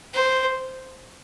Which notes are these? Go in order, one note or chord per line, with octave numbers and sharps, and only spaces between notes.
C5